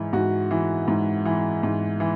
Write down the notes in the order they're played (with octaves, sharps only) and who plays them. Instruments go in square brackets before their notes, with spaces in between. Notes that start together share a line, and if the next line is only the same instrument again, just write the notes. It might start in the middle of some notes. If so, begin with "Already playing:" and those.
Already playing: [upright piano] G#2 E3
G#2 F#4
E3
G#2
E3
G#2
E3